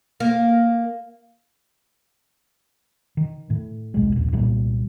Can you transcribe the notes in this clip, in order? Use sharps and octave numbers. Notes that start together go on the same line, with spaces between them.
A#3
D#3
A2
D1 B1 G#3
D#1 A#1
C2 A#2 D#3 G3